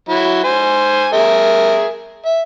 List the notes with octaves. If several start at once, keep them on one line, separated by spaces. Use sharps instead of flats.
F#3 E4
C5 G#5
G#4 A#4 E5
E5